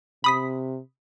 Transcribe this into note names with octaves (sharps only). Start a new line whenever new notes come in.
C3 B5 D#6 B6